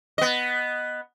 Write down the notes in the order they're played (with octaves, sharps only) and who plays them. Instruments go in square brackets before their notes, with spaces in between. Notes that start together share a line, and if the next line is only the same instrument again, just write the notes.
[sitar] B3 D#5